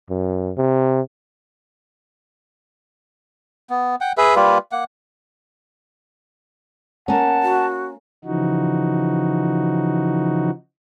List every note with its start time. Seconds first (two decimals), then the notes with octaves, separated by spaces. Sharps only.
0.10 F#2
0.58 C3
3.70 B3
4.01 F#5 G5
4.17 G#4 B4 E5
4.36 G3 A#3 F4 B4
4.72 A#3 F#5
7.08 A#3 C#4 F#5 A5
7.43 F#4
8.25 C#3 E3 F3 D#4 F#4